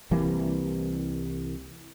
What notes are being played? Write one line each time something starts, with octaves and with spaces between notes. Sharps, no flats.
C2 E3 G3 A#3